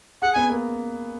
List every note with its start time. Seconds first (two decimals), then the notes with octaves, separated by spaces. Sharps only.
0.22 G#4 F#5
0.33 B3 G#5
0.50 A#3